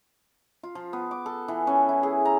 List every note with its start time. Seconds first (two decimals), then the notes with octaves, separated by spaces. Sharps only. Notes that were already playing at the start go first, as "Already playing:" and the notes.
0.63 F4
0.75 F3
0.93 B3
1.11 D6
1.26 A4
1.48 E3
1.67 C#4
1.89 E4
2.03 G#4
2.25 A#5